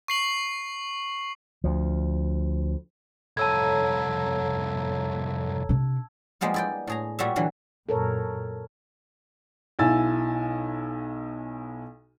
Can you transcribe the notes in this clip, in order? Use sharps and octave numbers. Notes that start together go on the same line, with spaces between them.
C#6 C7 F#7
D2 F3
C2 F2 A4 C#5 A5 A#5 E6 G#6
C3 D4
F3 G3 G#3 A#3 B3 F4
E4 D5 G5
A2 G#4 A#5
A#2 G3 F#4 C#5 E5
D3 E3 F#3 G3
F#2 A#2 A4 A#4 C#5
B1 E4 F5 G#5 E6 A6